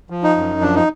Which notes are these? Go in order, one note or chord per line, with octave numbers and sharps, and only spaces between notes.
F3
D#4
F#2
F3 D4
D#4